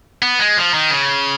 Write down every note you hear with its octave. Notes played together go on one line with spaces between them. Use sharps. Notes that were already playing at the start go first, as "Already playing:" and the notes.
B3
G#3
F3
D#3
C#3